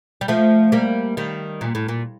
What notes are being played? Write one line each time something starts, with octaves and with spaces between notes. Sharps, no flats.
G3
F3 A3
G3 A#3
D#3 G3
A#2
A2
A#2